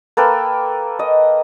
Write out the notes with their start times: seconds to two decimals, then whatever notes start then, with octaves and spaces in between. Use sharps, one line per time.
0.17 A#3 A4 B4 G5
0.99 D#5